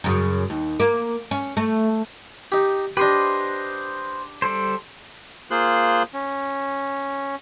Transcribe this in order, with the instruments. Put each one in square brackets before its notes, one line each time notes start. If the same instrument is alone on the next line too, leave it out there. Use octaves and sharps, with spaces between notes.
[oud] F#2 C#3
D#2
A#3
C#4
A3
[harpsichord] D#4 G4
[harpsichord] D4 G4 [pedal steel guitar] B4 C5 D#5
[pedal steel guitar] G3 A4 C5
[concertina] A#3 F4 G#4 C5 C6 F#6
C#4